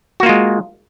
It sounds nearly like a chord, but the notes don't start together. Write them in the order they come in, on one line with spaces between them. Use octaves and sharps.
F#4 A#3 F4 G#3